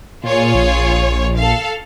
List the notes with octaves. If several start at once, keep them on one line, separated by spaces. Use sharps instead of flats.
A#2 F4 G#4 C#5
A#1
A4 F5